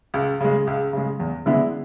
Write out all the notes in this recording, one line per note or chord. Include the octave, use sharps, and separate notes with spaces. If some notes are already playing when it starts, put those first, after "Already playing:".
C#2
C#3 G#3
C#2
C#3 G#3
E2
D3 G#3 B3 E4